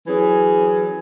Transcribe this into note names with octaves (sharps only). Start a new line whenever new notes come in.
E3 F#3 C#4 G#4